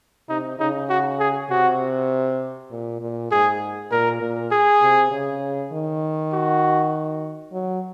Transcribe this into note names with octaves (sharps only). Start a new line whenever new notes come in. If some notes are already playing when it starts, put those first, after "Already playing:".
C3 D#4
C#3 D#4
F#4
G#4
C3 F#4
A#2
A#2
G#2 G#4
A#2 A#4
A#2
G#4
C3
C#3
D#3
F#4
F#3